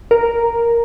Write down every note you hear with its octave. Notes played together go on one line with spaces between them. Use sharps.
A#4